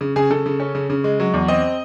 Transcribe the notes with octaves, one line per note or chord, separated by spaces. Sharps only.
C#3
C#3 G#4
C#3 A4
C#3
C#4
C#3
C#3
G#3
F#3
E2
C4 D#5